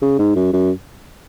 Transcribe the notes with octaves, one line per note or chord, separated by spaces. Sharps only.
C#3
G#2
F#2
F#2